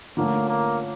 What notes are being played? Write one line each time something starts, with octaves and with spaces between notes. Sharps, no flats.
D3 F3 A3 A#3 C#4
A#3